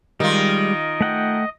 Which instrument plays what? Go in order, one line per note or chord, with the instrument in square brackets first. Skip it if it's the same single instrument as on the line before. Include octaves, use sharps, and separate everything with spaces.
[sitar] D#3 F4 [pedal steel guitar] G3 G#3 [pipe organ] D#5
[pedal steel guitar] A3 F#5 G5